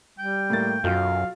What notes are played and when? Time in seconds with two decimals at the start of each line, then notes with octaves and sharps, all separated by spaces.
0.19 G3 G5
0.50 A2 A#3 A6
0.84 B1 F#2 F4 F5